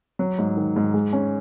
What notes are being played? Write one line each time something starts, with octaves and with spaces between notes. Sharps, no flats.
F#3
G#2
D#3
G#2
G#3
C#4